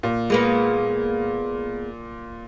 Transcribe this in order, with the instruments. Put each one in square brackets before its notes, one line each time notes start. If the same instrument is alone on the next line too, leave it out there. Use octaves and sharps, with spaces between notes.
[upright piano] A#2
[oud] G#3 A#3 B3